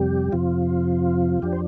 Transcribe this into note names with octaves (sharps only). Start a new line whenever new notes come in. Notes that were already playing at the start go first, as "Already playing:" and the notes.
Already playing: F2 C3 G3 G4
F2 C3 F3 F4
F2 F3 D4 G4
C5